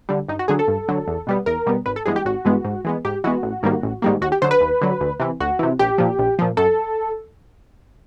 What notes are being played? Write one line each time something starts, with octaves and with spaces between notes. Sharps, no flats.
D3 G3
G2 D#4
F#4
D3 F#3 G#4
A4
G2
D3 F#3
E2
B2 G3 B3
E2 A#4
B2 G3 B3
G#1 B4
A4
G2 E3 G#3 B3 G#4
G4
G#1 F#4
G2 E3 G#3 B3
G#2
E3 G#3 B3
G#2 G4
E3 G#3 B3 F#4
A1
G#2 D#3 G3 A#3
A1
G#2 D#3 G3 A#3
D#2 F#4
G4
D3 F#3 C5
B4
D#2
D3 F#3
D2
C3 E3
D2 F#4
C3 E3
A#1 G4
A#2 F3
A#1
A#2 F3
F#2 A4